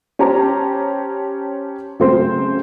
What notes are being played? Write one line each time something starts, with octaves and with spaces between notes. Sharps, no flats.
C#4 G4 C5 A5 A#5
C#3 F#3 A3 C4 C5